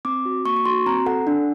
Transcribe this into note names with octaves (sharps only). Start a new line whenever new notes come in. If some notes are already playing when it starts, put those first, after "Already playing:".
C4 D6
F#4
A#3 C#6
C#6
F#4 C6
C4 A#5
A4 F#5
D4